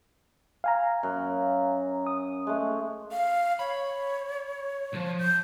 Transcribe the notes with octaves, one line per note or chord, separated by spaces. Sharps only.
F5 G#5 A#5
F#2
D#6
G#3 A3
F5
C#5 B5
B1 F3
G6